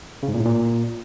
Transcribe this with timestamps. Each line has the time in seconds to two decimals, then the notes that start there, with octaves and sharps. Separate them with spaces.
0.23 C#3
0.29 G#2
0.34 A#2
0.40 A2
0.46 A#2